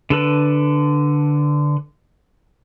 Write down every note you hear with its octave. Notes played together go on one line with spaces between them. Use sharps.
D3 A4 B4